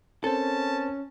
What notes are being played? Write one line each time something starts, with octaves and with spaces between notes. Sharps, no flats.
C4 C#4 A4 A#4 C5 A5